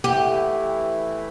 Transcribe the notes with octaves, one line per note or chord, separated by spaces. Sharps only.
E3 A3 E4 G4